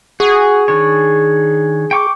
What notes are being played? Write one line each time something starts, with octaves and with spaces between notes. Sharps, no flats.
F#4 G#4
D#3 D4 C#5
G5 C#6 D6